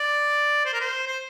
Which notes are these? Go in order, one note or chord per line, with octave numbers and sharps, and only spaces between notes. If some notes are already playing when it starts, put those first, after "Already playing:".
Already playing: D5
C5
A#4
C5
C5